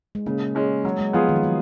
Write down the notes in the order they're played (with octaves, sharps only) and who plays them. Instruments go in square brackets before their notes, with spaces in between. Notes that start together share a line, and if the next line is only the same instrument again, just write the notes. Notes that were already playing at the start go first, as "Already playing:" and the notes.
[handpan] G#3
[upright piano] C#3 [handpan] A#3
[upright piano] G#3 C#4
[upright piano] F#3 [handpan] G#3
[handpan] G#3
[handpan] F3 [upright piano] B3 F4 G#4
[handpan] D#3
F3
F#3